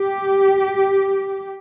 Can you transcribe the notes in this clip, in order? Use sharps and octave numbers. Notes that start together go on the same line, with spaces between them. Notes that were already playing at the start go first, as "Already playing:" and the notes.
Already playing: G4